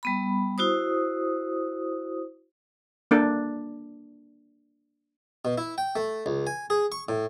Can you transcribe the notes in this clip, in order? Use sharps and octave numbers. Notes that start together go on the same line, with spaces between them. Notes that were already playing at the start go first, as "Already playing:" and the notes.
G3 B3 B5
E4 F#4 C5 D#6
A#3 D4 A4
B2
E4
G5
A3
C#2
G#5
G#4
C#6
A2